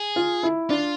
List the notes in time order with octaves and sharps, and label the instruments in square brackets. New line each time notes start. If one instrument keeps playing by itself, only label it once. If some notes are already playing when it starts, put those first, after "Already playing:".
Already playing: [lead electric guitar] G#4
[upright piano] F4
E4
[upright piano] D4 [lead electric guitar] F4